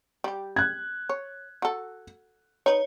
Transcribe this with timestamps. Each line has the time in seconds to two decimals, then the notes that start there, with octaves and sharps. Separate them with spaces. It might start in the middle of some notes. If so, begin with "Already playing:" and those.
0.24 G3 G4
0.56 F#6 G#6
1.09 C#5
1.62 F#4 A4
2.66 D#4 B4 C#5